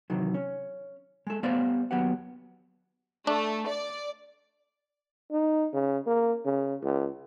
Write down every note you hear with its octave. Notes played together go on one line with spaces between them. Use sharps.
C3 D#3 E3 F#3
C#4
G#3 A4
G3 A3 B3 C5 D5 F5
D#2 F#3 B3 G4 B4 F#5
A3 D4
D5
D#4
C#3
A#3
C#3
C#2